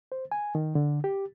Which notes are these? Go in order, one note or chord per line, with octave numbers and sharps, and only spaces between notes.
C5
G#5
D#3
D3
G4